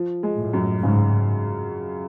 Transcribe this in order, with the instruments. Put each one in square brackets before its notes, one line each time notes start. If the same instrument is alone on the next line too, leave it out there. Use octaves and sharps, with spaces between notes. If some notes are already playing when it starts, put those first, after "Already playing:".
Already playing: [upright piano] F3
G#3
[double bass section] A2
[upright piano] F#2
[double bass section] G#2 [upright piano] C#3